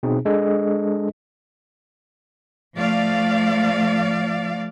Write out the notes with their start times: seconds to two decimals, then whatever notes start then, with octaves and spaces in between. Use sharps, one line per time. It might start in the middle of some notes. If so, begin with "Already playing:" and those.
0.03 B2 C4 D#4 G#4
0.25 G#3 D4 G#4 A4 D#5
2.75 F3 A3 D5 F5